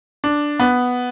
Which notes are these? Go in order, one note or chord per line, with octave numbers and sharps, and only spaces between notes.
D4
B3